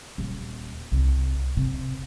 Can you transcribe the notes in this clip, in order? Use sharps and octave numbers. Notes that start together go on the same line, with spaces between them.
D#1
C2
C3